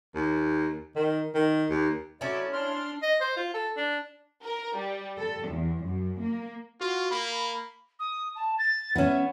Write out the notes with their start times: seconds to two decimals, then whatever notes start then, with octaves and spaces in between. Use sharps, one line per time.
0.15 D#2
0.96 D#3
1.35 D#3
1.69 D#2
2.21 F#3 A3 C#4 E4 D5
2.53 D4 C6 F6
3.03 D#5
3.20 C5
3.36 F4
3.54 A4
3.77 D4
4.44 A#4
4.78 G3
5.18 A4
5.50 E2
5.85 F#2
6.20 A#3
6.81 F4 F#4
7.11 A#3 B5
7.99 D#6
8.35 A5
8.58 A6
8.96 B3 C#4 E5